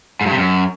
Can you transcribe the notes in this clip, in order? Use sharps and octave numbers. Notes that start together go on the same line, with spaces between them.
G#2
G2
C3
F#2